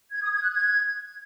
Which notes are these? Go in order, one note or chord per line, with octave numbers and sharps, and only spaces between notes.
G#6
D#6
G#6
F#6
G#6